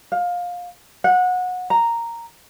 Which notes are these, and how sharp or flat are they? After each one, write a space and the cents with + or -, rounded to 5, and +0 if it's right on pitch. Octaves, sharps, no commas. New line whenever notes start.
F5 +20
F#5 -25
A#5 -5